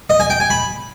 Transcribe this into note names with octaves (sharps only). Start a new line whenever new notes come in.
D#5
G#5
G5
G#5
B5